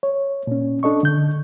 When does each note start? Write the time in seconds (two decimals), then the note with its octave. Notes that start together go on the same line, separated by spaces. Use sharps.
0.03 C#5
0.47 A#2 C#4
0.83 D4 A4 D#5 C#6
1.03 D3 G6